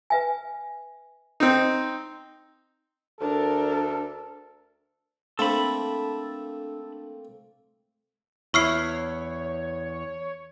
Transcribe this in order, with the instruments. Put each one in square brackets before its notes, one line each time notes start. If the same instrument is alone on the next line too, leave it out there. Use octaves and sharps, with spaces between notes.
[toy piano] B4 E5 G#5
[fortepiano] C4 D#4
[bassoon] D2 [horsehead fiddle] D4 A#4 [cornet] A4
[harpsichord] A3 A#3 C4 [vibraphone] D4 [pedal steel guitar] A4 B5
[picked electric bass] E2 [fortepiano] E4 [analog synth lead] C#5 [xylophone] C#6 F6 C7